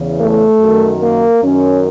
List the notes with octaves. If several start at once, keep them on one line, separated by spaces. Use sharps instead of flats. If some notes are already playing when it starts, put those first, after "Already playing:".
Already playing: E2 C#3 E3
A3
F#2 D#3
A#3
F#2 D#3 C#4